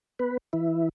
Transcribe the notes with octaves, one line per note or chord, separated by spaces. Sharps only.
B3 B4
E3 E4